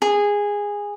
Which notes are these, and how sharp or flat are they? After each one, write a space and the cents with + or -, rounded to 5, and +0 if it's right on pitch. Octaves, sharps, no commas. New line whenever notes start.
G#4 -15